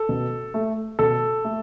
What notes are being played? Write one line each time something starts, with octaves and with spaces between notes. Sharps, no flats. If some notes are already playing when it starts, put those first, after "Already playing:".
Already playing: A4
B2
A3
B2 A4
A3